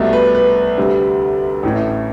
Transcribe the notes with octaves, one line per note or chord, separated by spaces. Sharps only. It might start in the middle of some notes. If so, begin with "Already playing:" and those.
Already playing: C2 B2 A3
B4
B4
D2 C3 G3
A1 A2 E3 A3